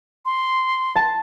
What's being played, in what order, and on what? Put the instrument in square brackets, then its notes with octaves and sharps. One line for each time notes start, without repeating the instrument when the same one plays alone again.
[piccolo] C6
[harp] A5